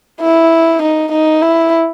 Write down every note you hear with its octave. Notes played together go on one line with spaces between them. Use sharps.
E4
D#4
D#4
E4